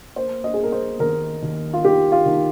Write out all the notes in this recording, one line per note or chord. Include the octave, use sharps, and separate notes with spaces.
A#3 C5
D#5
G#4
A#3
A#4
C5
D#2 A#4
D#2
F4
D#3 G4
F4
D#3